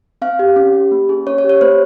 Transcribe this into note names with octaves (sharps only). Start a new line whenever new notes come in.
C4 F5
G4
C#4
G4
A#3
C#4 G#4
C#4 C#5
C#5
G4
C#5
A#3 C5